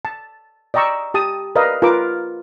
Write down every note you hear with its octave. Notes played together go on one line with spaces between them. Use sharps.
A5
D5 D#5 G5 A#5 C#6 E6
G4 A5 D#6
A#4 B4 D5 D#5 F5
F4 A#4 B4 D6